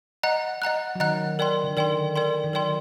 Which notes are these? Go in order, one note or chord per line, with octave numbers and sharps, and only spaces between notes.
D#5 F#5 A#5 F#6
D#5 F#5 A#5 F#6
F#3
D#3 D#5 F#5 A#5 F#6
A#4 D5 G5 C6
D3
D#3 A#4 D5 G5 C6
A#4 D5 G5 C6
D#3
F#3 A#4 D5 G5 C6